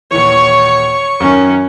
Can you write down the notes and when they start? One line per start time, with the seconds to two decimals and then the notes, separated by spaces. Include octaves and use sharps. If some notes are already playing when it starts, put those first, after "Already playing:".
0.11 D#1 E3 C#5 C#6
1.20 F#2 D#3 C#4